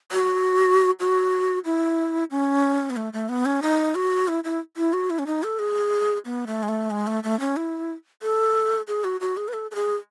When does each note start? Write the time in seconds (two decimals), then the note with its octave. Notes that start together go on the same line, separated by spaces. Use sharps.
0.12 F#4
1.00 F#4
1.65 E4
2.31 C#4
2.90 B3
2.96 A3
3.13 A3
3.29 B3
3.46 C#4
3.62 D#4
3.95 F#4
4.28 E4
4.44 E4
4.77 E4
4.93 F#4
5.10 E4
5.19 C#4
5.27 D#4
5.43 A4
5.59 G#4
6.25 B3
6.47 A3
6.63 G#3
6.69 A3
6.91 G#3
7.07 A3
7.24 A3
7.40 C#4
7.57 E4
8.23 A4
8.88 G#4
9.04 F#4
9.21 F#4
9.37 G#4
9.48 B4
9.53 A4
9.71 A4
9.75 G#4